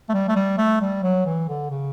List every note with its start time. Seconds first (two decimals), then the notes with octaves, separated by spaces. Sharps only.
0.09 A3
0.14 G3
0.28 A3
0.36 G3
0.58 A3
0.81 G3
1.03 F#3
1.26 E3
1.48 D3
1.70 C#3